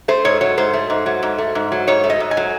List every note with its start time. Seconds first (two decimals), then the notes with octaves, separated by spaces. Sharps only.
0.08 A3 C5
0.25 G#2 C#5
0.41 F#3 C#5
0.58 G#2 C5
0.73 A3
0.90 G#2
1.06 F#3
1.23 G#2
1.38 A3
1.55 G#2
1.72 F#3
1.87 G#2 C#5
2.04 A3
2.10 D#5
2.20 G#2
2.31 G#5
2.37 F#3